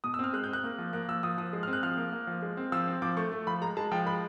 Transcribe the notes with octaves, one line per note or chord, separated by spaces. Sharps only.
B2 D#6
E6
C4 F6
G#3 F#6
G6
C4 F#6
A#3
F3
A#3 F#6
F3 E6
F3 D#6
F3 D#6
G#3
F6
C4
F#6
F3 F6
A#3
A#3
F3
G#3
C4
F3 E6
C4
F3 D6
A3 C#6
A3
F3 B5
G#3 A#5
G#3 A5
F3 G5
G#3 B5